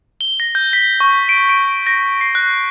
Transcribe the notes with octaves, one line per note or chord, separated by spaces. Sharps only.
G7
A#6
G6
B6
C#6
D7
D7
A#6
C7
F#6